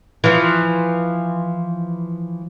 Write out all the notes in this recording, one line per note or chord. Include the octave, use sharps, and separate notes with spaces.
E3 F3